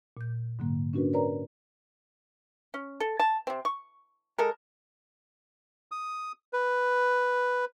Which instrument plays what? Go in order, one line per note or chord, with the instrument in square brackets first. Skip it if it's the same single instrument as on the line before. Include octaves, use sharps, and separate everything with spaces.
[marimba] A#2 G6
G#2 D3 F#3 A#3
C#4 D4 F#4 A#4 B4
A#4 B4 C#5 D5 A#5
[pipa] C#4
A4
A5
C3 C4
C#6
G#3 A4 A#4
[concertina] D#6
B4